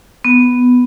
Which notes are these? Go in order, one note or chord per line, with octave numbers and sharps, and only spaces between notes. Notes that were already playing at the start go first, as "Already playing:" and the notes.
B3